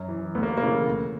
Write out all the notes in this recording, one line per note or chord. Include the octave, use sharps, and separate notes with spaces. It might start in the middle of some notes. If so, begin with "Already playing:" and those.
Already playing: F#2
E3
D2 B3
A#3
C#3 E3 A#3
D2